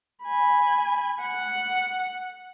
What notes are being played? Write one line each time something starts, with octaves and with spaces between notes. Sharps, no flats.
G#5 B5
F#5